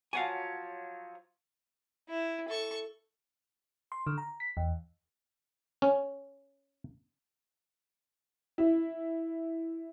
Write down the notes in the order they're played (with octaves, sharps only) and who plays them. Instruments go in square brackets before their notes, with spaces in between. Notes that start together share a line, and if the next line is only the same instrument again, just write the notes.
[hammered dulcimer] F3 F#3 C#5 [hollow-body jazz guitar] F5 F#5 G#5
[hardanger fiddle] E4
A4 C#6
[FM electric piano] C6
D3
A#5
B6
E2
[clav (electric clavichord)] C#4
[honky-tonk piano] E4